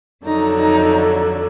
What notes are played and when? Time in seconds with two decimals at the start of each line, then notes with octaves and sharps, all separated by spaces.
0.25 F2 D3 F#3 D#4
0.58 D#4